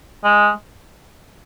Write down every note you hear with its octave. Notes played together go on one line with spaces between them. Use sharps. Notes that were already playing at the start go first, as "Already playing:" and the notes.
G#3